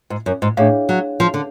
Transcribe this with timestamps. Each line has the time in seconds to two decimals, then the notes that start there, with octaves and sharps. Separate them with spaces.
0.10 G#2
0.26 F#2
0.42 G#2
0.57 A2 D4 G#4 C#5 F5
0.89 F#3
1.20 F3
1.34 D3